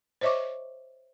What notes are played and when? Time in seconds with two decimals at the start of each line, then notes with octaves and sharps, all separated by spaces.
0.21 C5 C#5 D#5 E5 C#6 D6